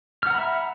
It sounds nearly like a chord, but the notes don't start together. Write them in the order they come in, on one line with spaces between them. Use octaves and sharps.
F6 F#5 A#5 B5 E5